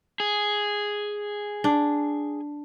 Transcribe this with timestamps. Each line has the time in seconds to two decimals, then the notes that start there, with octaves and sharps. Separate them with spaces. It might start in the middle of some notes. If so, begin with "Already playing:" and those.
0.20 G#4
1.64 D4